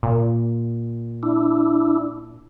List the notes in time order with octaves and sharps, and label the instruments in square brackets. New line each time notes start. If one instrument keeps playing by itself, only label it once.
[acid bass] A#2
[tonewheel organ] D4 E4